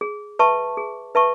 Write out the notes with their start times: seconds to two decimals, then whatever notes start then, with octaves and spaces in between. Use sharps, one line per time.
0.01 G#4
0.39 B4 E5 A5 C#6
0.77 G#4
1.15 B4 E5 A5 C#6